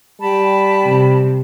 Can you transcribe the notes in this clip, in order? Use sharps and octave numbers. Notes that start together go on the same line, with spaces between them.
G3 G5 A5 B5
C3